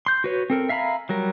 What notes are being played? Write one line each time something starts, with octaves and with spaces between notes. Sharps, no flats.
C6 G6
F#4 B4 C#5
C4 A4 A#4
E5 F5 G#5 A#5 B5
F#3 G3 A#4